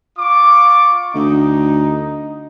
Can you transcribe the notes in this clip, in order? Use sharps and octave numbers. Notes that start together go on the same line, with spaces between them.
F4 C#6 D6
D2 D#4